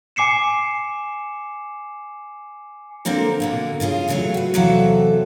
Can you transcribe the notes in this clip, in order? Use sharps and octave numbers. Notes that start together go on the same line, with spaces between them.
G#5 D6 C7 C#7 E7
D3 A#3 C4 A4 A#4
B2 D3 A#3
C#3 C#4 F4 G#4
E2 C#3 F#3 A3 G#4 F5
F#4 B4
E2 C3 F#3 A4 E5 F5